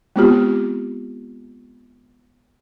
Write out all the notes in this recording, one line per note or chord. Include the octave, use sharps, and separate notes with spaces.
G#3 B3 C4 F4 G4